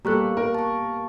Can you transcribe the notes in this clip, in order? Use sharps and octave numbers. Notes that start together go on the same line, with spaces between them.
G3 A#3 B3 G4 A4 A#5 C#6 F#6
A#4
A5 C#6